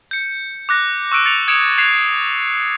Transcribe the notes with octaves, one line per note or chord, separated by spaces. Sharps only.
G6 C#7
D6 F#6 A#6
C#6 E6 F#6 D7 D#7
A6 C#7 D#7 F7
D#6 G#6 C#7 D7 E7 F7
F#6 G#6 C7 E7 F7